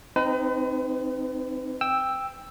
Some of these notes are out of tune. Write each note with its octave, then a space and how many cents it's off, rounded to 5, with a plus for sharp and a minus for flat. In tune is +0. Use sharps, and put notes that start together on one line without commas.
C4 +0 D#4 -5 B4 +40
G5 +10 E6 +0